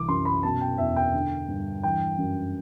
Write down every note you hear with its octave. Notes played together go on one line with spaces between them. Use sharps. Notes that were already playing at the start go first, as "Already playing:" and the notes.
Already playing: C2 E3 D6
F#2 C6
B5
B2 A5
G5
E2 E5
G5
D3
G2
E3 G5
F#2